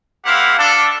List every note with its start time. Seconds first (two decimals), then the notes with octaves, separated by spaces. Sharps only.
0.25 A#3 C4 E4 G4 F5 F#5
0.58 D4 A4